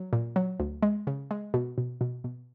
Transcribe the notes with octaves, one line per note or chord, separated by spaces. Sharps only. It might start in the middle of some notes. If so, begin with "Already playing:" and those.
Already playing: F#3
A#2
F#3
D2
G#3
C#3
G#3
B2
B2
B2
B2